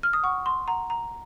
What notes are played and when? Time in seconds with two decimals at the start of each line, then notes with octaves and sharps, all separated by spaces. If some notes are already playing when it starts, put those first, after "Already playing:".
0.03 F6
0.13 D#6
0.23 F#5 C#6
0.46 C6
0.68 F#5 A#5
0.90 A#5